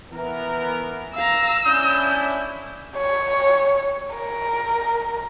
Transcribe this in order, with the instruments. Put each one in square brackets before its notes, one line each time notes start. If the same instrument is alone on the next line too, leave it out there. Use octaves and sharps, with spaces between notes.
[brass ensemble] E3 B3 A#4
[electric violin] F5 A#5 [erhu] E6
[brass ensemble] C#4 D4 E4 [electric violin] G6
[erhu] C#5
A#4